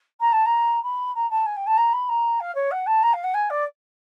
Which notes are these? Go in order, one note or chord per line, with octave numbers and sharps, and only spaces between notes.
A#5
A5
A#5
B5
A#5
A5
G#5
G5
A5
A#5
B5
A#5
F5
C#5
F#5
A5
A#5
F5
F#5
G#5
D5